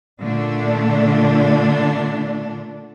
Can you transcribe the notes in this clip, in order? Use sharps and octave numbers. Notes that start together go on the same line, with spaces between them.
A#2 D3 A3 D4